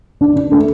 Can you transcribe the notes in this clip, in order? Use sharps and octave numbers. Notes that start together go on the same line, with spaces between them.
D4
D4
A3